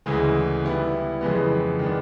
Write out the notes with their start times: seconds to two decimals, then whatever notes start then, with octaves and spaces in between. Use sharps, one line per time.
0.06 D2 C#3 E3 G#3
0.64 G3 B3 E4
1.21 F2 C#3 E3 G#3 B3
1.79 D#3 G#3 B3 D4